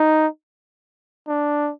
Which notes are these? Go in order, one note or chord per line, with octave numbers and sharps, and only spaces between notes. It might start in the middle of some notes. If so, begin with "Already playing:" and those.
Already playing: D#4
D4